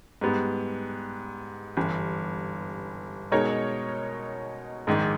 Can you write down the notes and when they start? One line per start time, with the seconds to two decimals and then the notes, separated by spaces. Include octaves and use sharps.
0.21 G#2 G3 B3
1.77 G1 G2 E3
3.31 B2 G#3 D#4 A#4 C#5
4.87 A#1 G#2 D#3